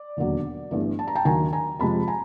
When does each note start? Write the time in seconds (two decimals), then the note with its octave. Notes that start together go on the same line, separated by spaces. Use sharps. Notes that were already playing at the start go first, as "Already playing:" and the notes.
Already playing: D5
0.17 E1 D#2 D3 F#3
0.71 G1 G2 E3 A3
0.99 A5
1.08 A#5
1.15 G5 A5
1.25 D#2 D#3 F#3 A#3 D4 G#5 A#5
1.53 G#5 A#5
1.79 F2 C3 F3 G#3 C4 A5 B5
2.08 G#5 A#5